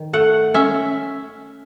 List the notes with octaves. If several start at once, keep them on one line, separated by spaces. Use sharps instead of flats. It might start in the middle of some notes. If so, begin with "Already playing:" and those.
Already playing: D#3
A3 F#5
C#4 E5